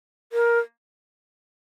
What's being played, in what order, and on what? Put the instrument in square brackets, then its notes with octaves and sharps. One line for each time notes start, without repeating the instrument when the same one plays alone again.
[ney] A#4